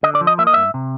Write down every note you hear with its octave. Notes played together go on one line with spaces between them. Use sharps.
D3 D#5
D5
F3
D#5
A#3 E5
D#5
G2 E5
C3